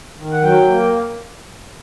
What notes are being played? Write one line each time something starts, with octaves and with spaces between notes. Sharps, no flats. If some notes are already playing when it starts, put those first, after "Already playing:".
D#3
F#5
F#3 G5
A#3